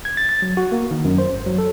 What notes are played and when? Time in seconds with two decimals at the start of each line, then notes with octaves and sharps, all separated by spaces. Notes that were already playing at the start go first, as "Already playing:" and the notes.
0.05 G#6
0.17 A6
0.29 A6
0.42 F#3
0.57 F#4
0.72 A#3
0.91 D#3
1.05 F#2
1.18 C5
1.33 G#1
1.46 F#3
1.58 A4